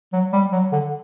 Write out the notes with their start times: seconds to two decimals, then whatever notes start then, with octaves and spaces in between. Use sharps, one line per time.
0.13 F#3
0.33 G3
0.52 F#3
0.72 D3